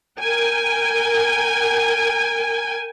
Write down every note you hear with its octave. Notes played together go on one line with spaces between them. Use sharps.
A#4 G5 G#5